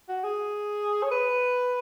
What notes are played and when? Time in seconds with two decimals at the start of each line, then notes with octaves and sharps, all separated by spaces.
0.08 F#4
0.24 G#4
1.03 C#5
1.11 B4